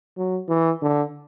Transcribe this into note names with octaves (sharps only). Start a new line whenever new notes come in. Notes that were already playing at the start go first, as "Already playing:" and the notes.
F#3
E3
D3